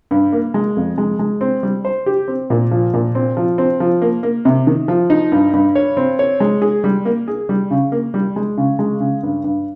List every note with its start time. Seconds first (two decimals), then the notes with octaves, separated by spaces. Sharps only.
0.11 G2
0.33 A#3
0.54 G#3
0.77 F2
0.98 G#3
1.19 G#3
1.41 C4
1.63 G3
1.85 C5
2.06 G4
2.28 C4
2.50 A#2
2.71 F3
2.94 A#2
3.15 C4
3.37 F3
3.58 C4
3.80 F3
4.02 A#3
4.23 A#3
4.45 C3
4.67 D#3
4.88 F3
5.10 D#4
5.32 G2
5.54 G2
5.75 C#5
5.97 C4
6.19 C#5
6.40 G#3
6.62 G#4
6.84 G3
7.05 A#3
7.28 G#4
7.49 G3
7.71 C#3
7.92 A#3
8.14 G3
8.36 G#3
8.57 C#3
8.79 G#3
9.00 C#3
9.23 G2
9.44 G2